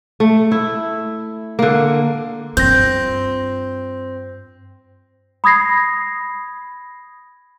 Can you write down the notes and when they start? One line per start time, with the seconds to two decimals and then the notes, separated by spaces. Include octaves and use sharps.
0.20 A3
0.52 E4
1.59 D3 A#3
2.57 G2 C4 F4 G6 A#6
5.44 B5 D#6 G#6 A#6 C7